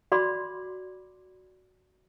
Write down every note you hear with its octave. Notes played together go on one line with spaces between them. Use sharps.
F#4 D5 B5 C6 D6